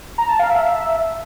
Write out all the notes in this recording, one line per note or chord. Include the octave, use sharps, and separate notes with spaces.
A#5
A5
F5
E5